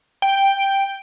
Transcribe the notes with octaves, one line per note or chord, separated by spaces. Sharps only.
G5